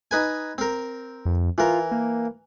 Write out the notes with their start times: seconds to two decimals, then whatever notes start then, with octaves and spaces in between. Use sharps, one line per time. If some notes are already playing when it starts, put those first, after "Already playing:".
0.11 D#4 B4 G#5
0.58 C4 A#4
1.25 F2
1.58 E3 F4 A#4
1.92 A#3